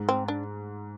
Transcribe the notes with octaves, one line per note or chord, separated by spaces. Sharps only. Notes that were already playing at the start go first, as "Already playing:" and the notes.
Already playing: G#2
C4
D4